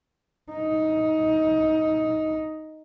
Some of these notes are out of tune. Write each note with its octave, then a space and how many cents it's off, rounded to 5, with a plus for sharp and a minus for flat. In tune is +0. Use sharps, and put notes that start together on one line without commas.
D#4 +15